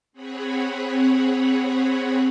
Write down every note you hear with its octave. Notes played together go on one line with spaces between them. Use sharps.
C4 G#4 C#5 F#5 B5